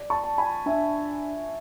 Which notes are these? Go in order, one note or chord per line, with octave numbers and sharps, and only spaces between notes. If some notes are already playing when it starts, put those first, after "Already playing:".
Already playing: D5
A5 C#6
A5
G#5 B5
D4 E5 G#5